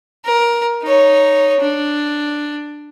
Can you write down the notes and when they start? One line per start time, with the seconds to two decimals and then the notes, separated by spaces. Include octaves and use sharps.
0.25 A#4
0.83 D#4 C#5
1.60 D4